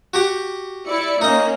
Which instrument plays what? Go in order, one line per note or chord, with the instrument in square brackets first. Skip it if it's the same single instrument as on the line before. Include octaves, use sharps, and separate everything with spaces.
[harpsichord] F#4 G4 F#5
[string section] E4 D5 C#7
[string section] A#3 C#4 [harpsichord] D#4 D#5